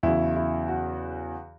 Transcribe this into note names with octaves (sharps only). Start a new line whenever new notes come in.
E2 C#3 F#3 E4
E4
F#4